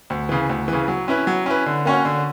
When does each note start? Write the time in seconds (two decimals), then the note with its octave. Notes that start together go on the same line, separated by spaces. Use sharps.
0.10 D2
0.29 C#3 E3
0.49 D2
0.68 C#3 E3
0.88 F#3
1.08 C#4 E4 B4
1.27 F#3
1.46 C#4 E4 B4
1.66 D3
1.85 A#3 C#4 F#4 C#5
2.05 D3